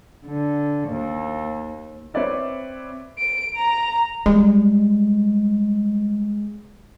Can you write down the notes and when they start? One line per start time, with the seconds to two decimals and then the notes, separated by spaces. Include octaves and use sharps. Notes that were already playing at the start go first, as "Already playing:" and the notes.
0.27 D3
0.88 D#2
2.14 C4 B4 C#5 D5 E5
3.19 D7
3.56 A#5
4.26 G3 G#3